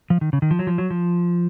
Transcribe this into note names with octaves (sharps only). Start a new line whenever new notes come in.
F3
D#3
C#3
D#3
F3
F#3
F3
F#3
F3